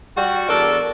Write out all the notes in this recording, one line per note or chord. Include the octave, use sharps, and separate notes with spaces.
G3 F#4
E2 D4 A4 A#4 D5